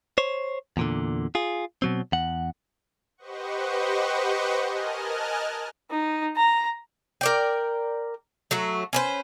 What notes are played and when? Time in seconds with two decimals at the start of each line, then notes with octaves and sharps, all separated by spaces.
0.18 C5 C#5
0.77 E2 A#2 D3
1.35 F4 G#4
1.82 B2 F#3 C4
2.12 E2 F#5
3.17 G4 B4 C5 D#5 F#5 C#6
4.62 A#4 D#5 G#5 A5 F6 F#6
5.90 D#4
6.36 A#5
7.21 A#4 D5 G5
8.51 F#3 A3 F#4
8.93 C#4 B4 C5